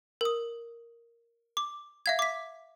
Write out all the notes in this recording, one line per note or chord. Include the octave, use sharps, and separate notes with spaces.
A#4 D#6
D6
E5 F5 G#6
D6 B6